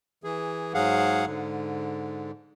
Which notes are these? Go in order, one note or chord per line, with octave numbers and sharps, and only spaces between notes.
E3 G#4
G#2 F#3 G#4 F5 F#5
G#2 D3